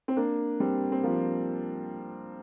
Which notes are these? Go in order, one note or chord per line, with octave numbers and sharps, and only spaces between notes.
C4
A#3 D4
G3 C4
C4
F3 A#3